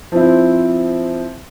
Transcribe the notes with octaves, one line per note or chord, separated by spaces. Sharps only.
F3 C4 E4